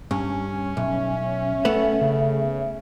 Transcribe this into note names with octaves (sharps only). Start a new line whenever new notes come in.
G2 C#4
B1 E5
A3 B3
C#3